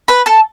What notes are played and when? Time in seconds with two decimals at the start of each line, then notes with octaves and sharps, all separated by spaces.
0.08 B4 B5
0.26 A4 A5